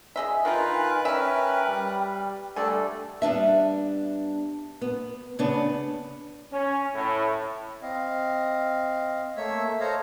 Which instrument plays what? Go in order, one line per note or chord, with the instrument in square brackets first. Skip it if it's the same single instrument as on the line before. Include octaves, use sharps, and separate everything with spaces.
[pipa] G#4 D#5 E5 [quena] G#5
[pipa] D#3 D#4 [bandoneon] F4 A#4 F5 [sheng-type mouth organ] B4 F#6
[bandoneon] C#4 A#4 [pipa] E5 G#5 [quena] G5
[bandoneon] G3
[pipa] D3 G#5 [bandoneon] G3 A3 [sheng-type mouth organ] A4 D5
[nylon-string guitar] G3 B3 D4 E5
B3
C#3 B3 D4
[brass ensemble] C#4
A2
[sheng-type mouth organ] C4 D#5 F5
A3 A#3 C#5 E5 E6
A4 C5 C#5 D#5 F5 A#5